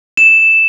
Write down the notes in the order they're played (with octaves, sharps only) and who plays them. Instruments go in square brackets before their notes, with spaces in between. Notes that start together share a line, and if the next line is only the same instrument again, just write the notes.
[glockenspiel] E7